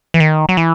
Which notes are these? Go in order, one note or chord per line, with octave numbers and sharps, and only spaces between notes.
E3
D#3
F#3
E3